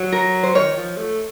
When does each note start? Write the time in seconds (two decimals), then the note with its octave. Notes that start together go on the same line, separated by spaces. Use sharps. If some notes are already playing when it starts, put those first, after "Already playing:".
Already playing: F#3
0.12 A#4
0.43 C5
0.55 D#3 C#5
0.77 F3
0.97 A3